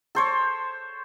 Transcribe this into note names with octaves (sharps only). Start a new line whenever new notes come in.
A4 C5 C#5